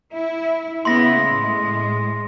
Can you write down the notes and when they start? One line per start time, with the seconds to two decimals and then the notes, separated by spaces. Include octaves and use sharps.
0.13 E4
0.85 C#3 B3 E4 C6 A#6
1.22 A2 G#3